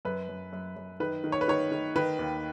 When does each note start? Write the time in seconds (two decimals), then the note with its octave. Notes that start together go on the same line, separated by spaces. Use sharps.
0.05 F#2 B4
0.29 F#2
0.53 F#2
0.76 F#2
1.00 D#3 B4
1.24 D#3
1.32 C#5
1.41 B4
1.48 D#3 C#5
1.71 D#3
1.96 D#3 B4
2.19 D#2